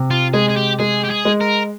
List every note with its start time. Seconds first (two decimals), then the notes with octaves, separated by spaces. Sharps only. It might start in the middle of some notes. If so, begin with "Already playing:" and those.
Already playing: C3
0.11 F4
0.33 G#3 G#4
0.49 G#4
0.56 G4
0.80 G#3 G#4
1.05 G4
1.11 G#4
1.25 G#3
1.41 A#4